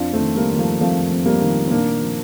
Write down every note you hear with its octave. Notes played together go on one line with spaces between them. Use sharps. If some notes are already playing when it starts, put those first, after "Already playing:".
Already playing: F2 D4 F4
A3 C4
D#3
G3 A#3
D#3
F3 A3
F2 F3 A3
F2
G3 A#3
D#3
C4
A#2 A#3 D4
F3